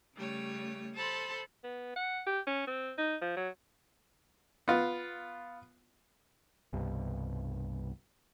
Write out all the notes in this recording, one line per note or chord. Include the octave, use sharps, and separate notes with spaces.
C#3 G3 A3 C#5
A4 C5 A5 B5 C6
B3
F#5
G4
C#4
C4
D#4
F3
F#3
B3 F4
C2 G2 B2